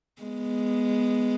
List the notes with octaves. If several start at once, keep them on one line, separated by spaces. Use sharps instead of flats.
G#3 B3